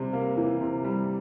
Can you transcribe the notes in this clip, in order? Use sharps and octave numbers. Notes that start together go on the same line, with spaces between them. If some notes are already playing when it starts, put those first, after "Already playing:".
Already playing: C3 G3
A#3
E3
C3
G3